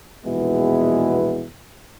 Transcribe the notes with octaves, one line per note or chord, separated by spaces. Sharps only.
A#1 E2 B2 G#3 B3 E4